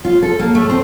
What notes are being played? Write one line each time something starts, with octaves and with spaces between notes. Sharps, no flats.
F4
A4
A#3
A3
C4